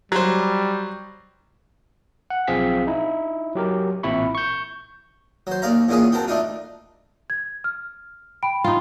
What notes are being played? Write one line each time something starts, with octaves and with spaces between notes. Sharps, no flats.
F#3 G3 C5
F#5
B1 F3 C4 G#4 F5 B6
D#4 E4
F#3 G4 A#4
A1 A#2 C4 E4 B5 C#6
C#6 G6
F#3 C5
D#2 D5 F5 A#5
E2 A#2 C#4 F4 G#4
C4 F#4 A#4 A5
A3 D4 D#4 F4
G#6
F6
G5 B5 D7
D#4 F4